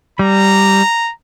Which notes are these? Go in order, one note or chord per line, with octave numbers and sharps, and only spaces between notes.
G3 A#5